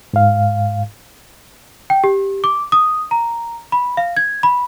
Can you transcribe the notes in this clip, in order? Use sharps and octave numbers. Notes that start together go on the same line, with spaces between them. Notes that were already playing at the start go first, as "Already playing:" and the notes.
G#2 F5
G5
G4
D6
D#6
A#5
B5
F5
G#6
B5